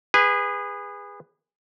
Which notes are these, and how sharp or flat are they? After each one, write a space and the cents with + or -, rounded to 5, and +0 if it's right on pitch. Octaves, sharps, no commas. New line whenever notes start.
G#4 -25 B4 +0